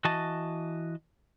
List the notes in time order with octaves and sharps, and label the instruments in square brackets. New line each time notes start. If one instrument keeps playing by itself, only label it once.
[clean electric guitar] E3 F#4 D#5 A5